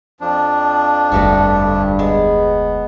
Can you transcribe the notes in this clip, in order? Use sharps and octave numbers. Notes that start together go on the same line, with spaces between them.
F2 F3 D4
F1 D2 G2 A3 F#4
G#3 B3